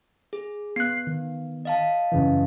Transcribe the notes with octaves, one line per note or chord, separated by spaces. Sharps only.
G#4
B3 F#6 C7
D#3
D#5 F5 A5
F#2 C#3 E3